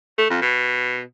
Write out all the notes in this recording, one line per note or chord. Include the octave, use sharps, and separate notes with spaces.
A3
F2
B2